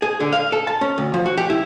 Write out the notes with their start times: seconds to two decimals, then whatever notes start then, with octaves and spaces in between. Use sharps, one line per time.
0.02 G#4
0.20 D3
0.32 F5
0.52 A4
0.67 A5
0.81 C#4
0.98 D2
1.14 F3
1.26 F#4
1.37 G4
1.50 E4